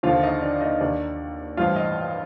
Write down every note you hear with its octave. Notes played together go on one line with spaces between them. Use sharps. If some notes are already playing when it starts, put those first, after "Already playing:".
D#2 D3 F3 F4 F5
D#4 D#5
D4 D5
D#4 D#5
D#2 D#3 D4 D5
A1 G2 F3 F4 F5
D#5